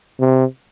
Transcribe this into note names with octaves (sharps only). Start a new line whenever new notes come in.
C3